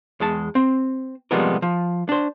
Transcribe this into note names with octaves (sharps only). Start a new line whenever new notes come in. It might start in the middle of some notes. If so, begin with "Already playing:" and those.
E2 G#3 A5
C4
C3 F3 G3 G#3 B3 A#4
F3
D4 C5